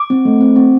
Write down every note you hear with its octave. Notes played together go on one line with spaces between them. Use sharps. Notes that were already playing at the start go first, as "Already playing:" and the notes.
Already playing: D6
C4
A3
C4
C4